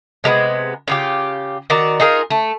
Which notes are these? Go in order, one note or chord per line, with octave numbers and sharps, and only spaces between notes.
C3 G#3 A3 B3
C#3 F4 G4
D#3 F#4 D5 A#5
D#4 F4 G#4 A#4
A3